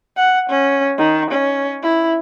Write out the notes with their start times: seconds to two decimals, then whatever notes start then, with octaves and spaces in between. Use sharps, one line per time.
0.17 F#5
0.50 C#4
0.98 D#3
1.31 C#4
1.82 E4